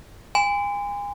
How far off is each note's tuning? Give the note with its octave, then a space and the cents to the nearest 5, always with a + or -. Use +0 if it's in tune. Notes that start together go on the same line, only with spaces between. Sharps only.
G#5 -35 C6 -35